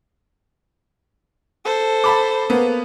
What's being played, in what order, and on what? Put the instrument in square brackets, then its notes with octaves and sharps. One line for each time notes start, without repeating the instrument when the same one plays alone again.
[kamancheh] A4 C5
[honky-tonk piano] A5 B5 D6
A#3 B3 B4